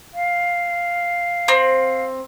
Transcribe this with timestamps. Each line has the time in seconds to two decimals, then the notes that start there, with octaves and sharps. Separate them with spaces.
0.14 F5
1.48 C4